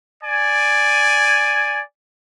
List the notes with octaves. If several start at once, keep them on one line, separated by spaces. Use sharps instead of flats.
D5 G#5